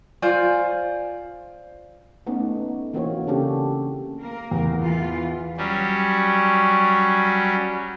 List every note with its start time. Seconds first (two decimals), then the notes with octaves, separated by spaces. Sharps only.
0.22 F4 C5 D5 G#5
2.26 A3 B3 C#4 D#4
2.93 E3 A#3 C4 F#4 A#4 C#5
3.27 C#3 C#4 D4 G4 A4
4.20 A#3 A#4
4.51 E2
4.81 E3 F4
5.57 F#3 G3 C#4